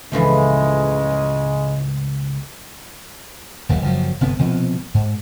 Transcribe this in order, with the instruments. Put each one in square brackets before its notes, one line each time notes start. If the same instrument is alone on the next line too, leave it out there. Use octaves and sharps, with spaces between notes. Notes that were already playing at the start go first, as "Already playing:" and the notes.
[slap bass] C#2 A2 [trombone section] C#3 G#3 [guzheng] E3 F3 A3
[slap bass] D#1 D#2 F#3 G3
F#1 F3 F#3
G1 C3 B3
C2 B2 F3 C4
G#2